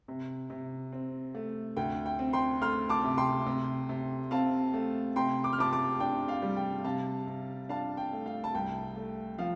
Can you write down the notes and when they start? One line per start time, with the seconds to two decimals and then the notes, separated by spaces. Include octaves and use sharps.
0.08 C3
0.50 C3
0.92 C4
1.35 A3
1.77 D2 G5
2.06 G5
2.19 C4
2.33 G5 C6
2.62 A3 C6 F6
2.89 A5 D6
3.04 C3
3.18 G5 C6
3.46 C3
3.89 C3
4.31 C4 F5 A5
4.74 A3
5.16 C3 G5 C6
5.44 D6
5.53 F6
5.58 C3 A5 D6
5.73 A5 D6
6.00 D4 G5
6.28 F5
6.42 G3
6.57 G5
6.84 C3 F5 A5
7.27 C3
7.69 D4 F5 A5
7.97 G5
8.13 A3
8.26 F5
8.44 A5
8.55 C2 G5
8.96 A3
9.38 F3 F5